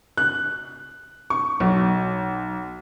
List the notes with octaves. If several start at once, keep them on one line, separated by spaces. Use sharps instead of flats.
F#6
C#6
B1